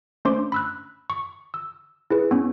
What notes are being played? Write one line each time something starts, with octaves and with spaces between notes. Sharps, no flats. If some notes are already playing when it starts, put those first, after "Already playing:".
A3 C#4 D4 C5 C6 D6
B5 E6 F#6
C#6
E6
E4 G#4 B4
B3 C#4